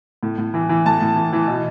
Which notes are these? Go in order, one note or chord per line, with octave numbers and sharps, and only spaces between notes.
A2
A2
E3
E3
A2 A5
A2
E3
E3
B2